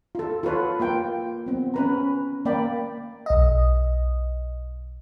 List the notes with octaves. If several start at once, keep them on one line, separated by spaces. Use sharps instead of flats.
F4 A4
F4 A4 B4 C#5
A#3 F4 G5
B3 C4
C#4 B4 A#5
A#3 D5 G5 B5
B1 D#5